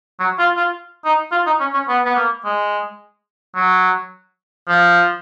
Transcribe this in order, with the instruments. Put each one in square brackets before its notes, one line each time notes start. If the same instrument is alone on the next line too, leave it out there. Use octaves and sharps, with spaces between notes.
[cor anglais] F#3
F4
F4
D#4
F4
D#4
C#4
C#4
B3
B3
A#3
G#3
F#3
F3